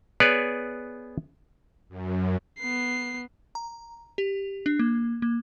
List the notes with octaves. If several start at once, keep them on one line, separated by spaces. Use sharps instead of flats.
B3 G#4 B4 C#5 D5
F#2
B3 C7
A#5
G4
D4
A#3
A#3